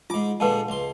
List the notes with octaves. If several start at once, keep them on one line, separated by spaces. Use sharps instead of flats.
G#2 F4 D6
A#2 D3 G#3 B4 A5
C#2 C6